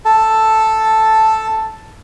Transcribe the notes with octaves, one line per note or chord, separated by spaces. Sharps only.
A4 A5